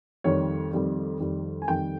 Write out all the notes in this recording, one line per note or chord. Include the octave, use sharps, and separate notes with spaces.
F2 D#3 G3 C#5
F2 D#3 G3
F2 D#3 G3
G#5
F2 D#3 G3 G5